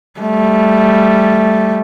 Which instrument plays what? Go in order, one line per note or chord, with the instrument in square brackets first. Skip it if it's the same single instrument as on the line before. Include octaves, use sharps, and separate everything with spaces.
[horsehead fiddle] G3 A3